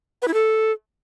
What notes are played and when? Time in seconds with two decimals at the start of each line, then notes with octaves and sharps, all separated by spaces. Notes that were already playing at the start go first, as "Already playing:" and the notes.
0.22 B4
0.28 E4
0.34 A4